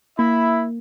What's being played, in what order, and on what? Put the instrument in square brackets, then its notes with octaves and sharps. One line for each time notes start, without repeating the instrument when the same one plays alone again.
[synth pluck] A#3 [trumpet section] E4 E5 B5